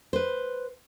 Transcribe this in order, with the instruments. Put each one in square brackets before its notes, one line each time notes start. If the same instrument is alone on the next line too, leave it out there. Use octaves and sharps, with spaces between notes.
[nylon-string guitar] B4 C5